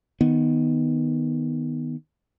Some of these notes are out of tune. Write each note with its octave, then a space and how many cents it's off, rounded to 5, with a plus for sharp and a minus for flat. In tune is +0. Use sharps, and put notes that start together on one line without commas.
D#3 +0 B3 -5